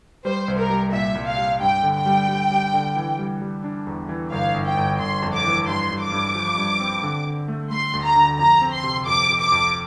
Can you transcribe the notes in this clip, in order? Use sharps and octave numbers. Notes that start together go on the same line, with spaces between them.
G3 C5
C2
A#4
G3
A#2 E5
C2
F5
G3
G2 G5
D3
G5
G3
G3
G3
D3
E3
G3
G3
D4
E2
E3
G1 F5
G1
G5
G1
G1 C6
F2
D6
E3
G2 C6
G2
D6
G2
F3
G2
C4
D3
D3
A3
A3 C6
D2
A#5
D3
F2 A#5
C4
C6
C3
F2 D6
F2
D6
F2